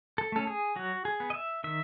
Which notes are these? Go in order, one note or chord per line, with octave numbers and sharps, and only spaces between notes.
A4
A3 C#4 A4
G#4
F#3 F#4
G#4
B3
D#5
E5
D#3 E5